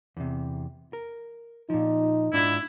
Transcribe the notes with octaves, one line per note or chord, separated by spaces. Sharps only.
E2 C3
A#4
A#2 F3 D#4
G#2 D4 E4 F4